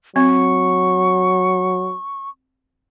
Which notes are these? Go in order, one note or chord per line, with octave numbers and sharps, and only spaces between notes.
F#3 C4 C#6